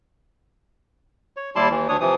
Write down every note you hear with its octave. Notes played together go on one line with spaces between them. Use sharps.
C#5
D#2 G3 E4 D5 A5 C6
D#2 E3
D2 D4 C#5 D#6
C3 E3 F3 D#6